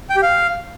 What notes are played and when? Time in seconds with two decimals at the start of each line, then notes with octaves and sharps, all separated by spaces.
0.10 G5
0.16 G4
0.22 F5